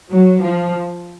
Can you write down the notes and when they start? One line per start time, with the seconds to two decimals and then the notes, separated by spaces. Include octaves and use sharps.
0.10 F#3
0.40 F3